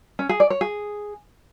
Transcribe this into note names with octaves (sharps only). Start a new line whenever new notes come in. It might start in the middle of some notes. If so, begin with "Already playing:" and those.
C#4
G#4
D5
C#5
G#4